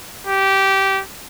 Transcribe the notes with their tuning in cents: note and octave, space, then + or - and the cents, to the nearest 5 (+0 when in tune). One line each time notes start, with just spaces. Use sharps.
G4 -15